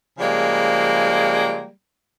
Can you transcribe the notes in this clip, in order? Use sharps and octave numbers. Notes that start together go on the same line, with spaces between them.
C#3 F3 G3 G#3 A#3